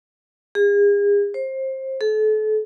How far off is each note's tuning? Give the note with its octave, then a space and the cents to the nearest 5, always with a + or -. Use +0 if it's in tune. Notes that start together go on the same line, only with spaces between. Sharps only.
G#4 -40
C5 +25
A4 -35